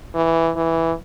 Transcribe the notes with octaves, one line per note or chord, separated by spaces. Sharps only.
E3
E3